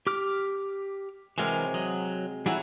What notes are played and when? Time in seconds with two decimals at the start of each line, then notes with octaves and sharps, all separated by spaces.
0.07 G4 D6 F6
1.38 C3 E3 F#3 G#3 A#4
1.74 F#3 D#5
2.46 E3 F#3 G3 E4 F#4 F#5